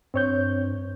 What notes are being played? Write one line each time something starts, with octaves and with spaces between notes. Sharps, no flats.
G2 C4 C#5 G6